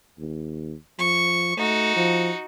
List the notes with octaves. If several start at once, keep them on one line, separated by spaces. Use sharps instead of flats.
D#2
F3 C#6
A3 D#4 F#4
F3